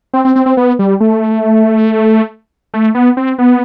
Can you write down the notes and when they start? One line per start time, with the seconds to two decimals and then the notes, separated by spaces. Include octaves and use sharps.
0.13 C4
0.25 C4
0.36 C4
0.46 C4
0.57 B3
0.79 G3
1.00 A3
2.74 A3
2.95 B3
3.17 C4
3.38 B3